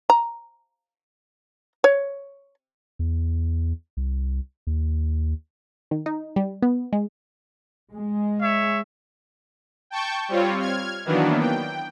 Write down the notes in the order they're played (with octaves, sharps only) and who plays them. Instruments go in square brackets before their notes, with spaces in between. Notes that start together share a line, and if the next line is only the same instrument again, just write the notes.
[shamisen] A#5
C#5
[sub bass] E2
C2
D#2
[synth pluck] D#3
D#4
G3
B3
G#3
[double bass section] G#3
[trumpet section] C#5 E5
[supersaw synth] G5 A5 C#6 G6
G3 C4 F4 C#5
F6 G#6
D#3 E3 F#3 A#3 B3 D4
G5